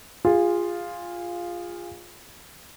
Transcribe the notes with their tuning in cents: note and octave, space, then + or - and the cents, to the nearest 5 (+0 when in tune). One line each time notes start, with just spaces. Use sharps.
F4 +0 G#4 -25